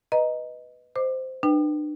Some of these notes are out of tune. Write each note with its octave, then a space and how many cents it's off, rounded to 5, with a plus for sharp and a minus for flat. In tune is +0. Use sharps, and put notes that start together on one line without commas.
B4 +0 D#5 +0 A#5 +10
C5 -10 D#5 -5 D6 +25
D4 +40 B4 +0 G5 +0